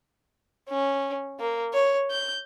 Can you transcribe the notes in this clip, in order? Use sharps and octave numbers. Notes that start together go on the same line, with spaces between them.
C#4
A#3
C#5
G6